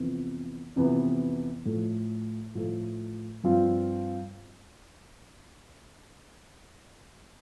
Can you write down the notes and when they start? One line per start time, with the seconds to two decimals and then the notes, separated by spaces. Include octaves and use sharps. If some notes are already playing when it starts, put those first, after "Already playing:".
Already playing: F2 C3 E3 B3
0.76 F2 C3 E3 B3
1.65 A2 F3 A3
2.55 A2 F3 A3
3.44 G2 F3 C4 F4